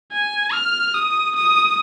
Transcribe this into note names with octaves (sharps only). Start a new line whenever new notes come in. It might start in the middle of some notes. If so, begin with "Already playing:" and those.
G#5
F6
D#6
D#6